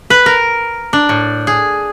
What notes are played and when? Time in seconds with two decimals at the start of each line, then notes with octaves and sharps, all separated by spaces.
0.10 B4
0.26 A#4
0.93 D4
1.09 A2
1.47 G#4